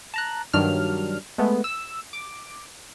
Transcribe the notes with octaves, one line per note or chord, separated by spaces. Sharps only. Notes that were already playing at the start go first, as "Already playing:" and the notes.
A5 A#5 F#6
G2 D#3 F#3 D4 F6
G#3 A3 B3
E6
D6